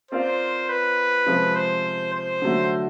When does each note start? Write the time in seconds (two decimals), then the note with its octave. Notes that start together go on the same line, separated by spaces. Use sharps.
0.11 C4 F4 A#4 C5 D5 F5
0.69 B4
1.26 C3 F3 G#3 C4 F4
1.55 C5
2.13 C5
2.42 D3 F#3 A3